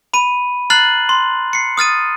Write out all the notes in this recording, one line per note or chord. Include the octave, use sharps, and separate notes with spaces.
B5 D#7
A#5 F6 F#6 A6 C7 F#7
C6
C7 C#7
D#6 F6 A6 D#7